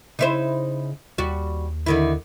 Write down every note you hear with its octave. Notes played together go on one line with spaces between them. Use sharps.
C#3 D#4 E4 C5
D#2 G3 F#4
D3 D#3 E4